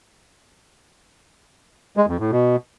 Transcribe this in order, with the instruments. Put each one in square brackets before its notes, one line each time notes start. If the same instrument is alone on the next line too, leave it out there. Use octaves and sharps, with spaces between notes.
[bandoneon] G#3
F2
A2
B2